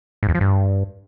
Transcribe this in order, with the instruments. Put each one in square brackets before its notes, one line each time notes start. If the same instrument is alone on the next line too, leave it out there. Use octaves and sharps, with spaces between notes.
[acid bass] G#2
E2
F3
G2